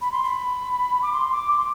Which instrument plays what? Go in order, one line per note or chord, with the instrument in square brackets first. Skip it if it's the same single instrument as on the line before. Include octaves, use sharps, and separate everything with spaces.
[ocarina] B5
C6
B5
D6
C6
D6
C6
D6